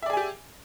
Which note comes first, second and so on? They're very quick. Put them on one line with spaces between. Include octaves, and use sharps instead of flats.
E5 D5 G#4 G#5 G4